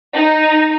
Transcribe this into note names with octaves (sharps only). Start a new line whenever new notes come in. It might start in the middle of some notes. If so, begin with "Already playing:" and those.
D#4